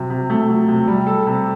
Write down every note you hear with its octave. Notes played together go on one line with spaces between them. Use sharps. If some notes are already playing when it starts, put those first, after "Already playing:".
Already playing: C3 F#3
C3
A3
F#3
C3
G3
A4
C3